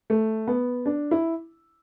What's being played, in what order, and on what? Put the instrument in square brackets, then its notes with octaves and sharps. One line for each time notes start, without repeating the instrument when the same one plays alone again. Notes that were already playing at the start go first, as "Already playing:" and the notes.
[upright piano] A3
B3
D4
E4